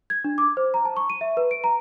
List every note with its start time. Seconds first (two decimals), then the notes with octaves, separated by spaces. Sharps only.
0.10 G#6
0.24 D4
0.38 D6
0.57 C5
0.74 A#5
0.85 A5
0.97 C#6
1.10 D#7
1.21 E5
1.37 B4
1.51 D7
1.64 A#5